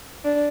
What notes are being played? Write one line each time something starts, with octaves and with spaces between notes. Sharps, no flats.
D4